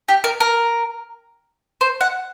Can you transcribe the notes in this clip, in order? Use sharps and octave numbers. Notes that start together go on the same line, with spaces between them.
G4
A#4
A#4
C5
F#5